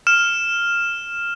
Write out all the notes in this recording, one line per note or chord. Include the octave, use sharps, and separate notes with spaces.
F6 E7